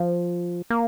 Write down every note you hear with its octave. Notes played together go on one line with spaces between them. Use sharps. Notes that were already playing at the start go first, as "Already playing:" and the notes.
Already playing: F3
A#3